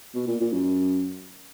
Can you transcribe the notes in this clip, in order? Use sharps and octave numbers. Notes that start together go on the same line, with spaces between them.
B2
A#2
A#2
F#2